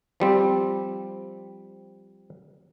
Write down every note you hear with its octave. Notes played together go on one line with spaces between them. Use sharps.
F3 G3 C4